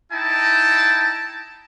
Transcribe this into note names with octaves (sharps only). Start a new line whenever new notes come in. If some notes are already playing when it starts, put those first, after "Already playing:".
D#4 E4 G5 A5 A#5